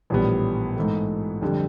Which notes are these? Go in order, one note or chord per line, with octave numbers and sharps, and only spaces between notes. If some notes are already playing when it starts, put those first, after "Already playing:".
A#1 A2 E3 G3 B3
G#2 E3 A3
F2 D3 G3